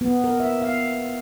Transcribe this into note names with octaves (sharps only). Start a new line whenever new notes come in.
B3
A#4
E5
F5